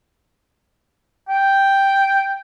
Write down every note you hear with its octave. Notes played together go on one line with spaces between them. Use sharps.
G5